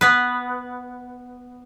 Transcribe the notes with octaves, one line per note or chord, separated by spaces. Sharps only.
B3 B4